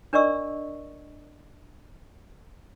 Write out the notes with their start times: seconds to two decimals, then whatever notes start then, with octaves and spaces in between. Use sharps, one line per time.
0.13 D4 A#4 D5 D#5 C#6 E6